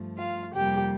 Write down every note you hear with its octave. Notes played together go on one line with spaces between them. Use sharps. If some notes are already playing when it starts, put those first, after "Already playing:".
Already playing: G2 F3 A3
F4 F5
F2 C3 G3 A#3 G4 G5